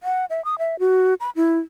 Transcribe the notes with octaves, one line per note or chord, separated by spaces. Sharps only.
F#5
E5
D#6
E5
F#4
B5
E4